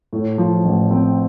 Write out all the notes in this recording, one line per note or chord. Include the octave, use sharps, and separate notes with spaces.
A2
F3
A1
C4